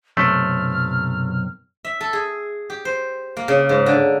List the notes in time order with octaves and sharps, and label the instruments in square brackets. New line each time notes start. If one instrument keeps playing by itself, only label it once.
[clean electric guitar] B1 F#2 C3 [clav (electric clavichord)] A3 [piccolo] F6
[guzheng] E5
A4
G#4
G4
C5
A#3
C#3
G#2
D3